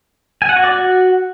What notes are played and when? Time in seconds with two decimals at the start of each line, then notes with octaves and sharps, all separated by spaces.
0.42 G#5
0.49 F#5
0.56 F#4
0.64 D5
0.71 F#4